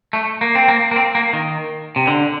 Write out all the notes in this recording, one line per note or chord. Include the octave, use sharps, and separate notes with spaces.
A3
A#3
C4
A#3
A#3
C4
A#3
D#3
C3
D3